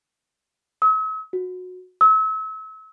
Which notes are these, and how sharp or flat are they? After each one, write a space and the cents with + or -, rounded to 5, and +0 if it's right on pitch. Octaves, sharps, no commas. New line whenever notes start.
E6 -45
F#4 -20
E6 -35